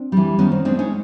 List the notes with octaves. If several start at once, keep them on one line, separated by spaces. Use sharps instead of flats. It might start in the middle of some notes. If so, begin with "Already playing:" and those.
Already playing: C4 D4
E3 G3
D#3 B3 C#4
C4
G#3 B3 C4 D4
C#4 D#4